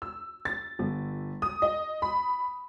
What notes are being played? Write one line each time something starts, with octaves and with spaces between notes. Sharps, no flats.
E6
A6
G1
D#6
D#5
B5